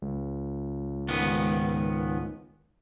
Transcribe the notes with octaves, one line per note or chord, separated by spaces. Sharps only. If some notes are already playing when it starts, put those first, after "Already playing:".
C#2
G#2 D#3 B3